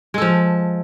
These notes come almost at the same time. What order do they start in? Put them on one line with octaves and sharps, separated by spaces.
G#3 A4 F3